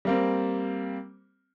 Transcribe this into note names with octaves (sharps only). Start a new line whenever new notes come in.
G3 A#3 C4